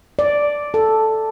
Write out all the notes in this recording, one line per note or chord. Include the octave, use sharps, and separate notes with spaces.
D5
A4